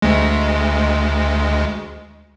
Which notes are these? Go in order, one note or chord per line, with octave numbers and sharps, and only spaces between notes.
D2 G#3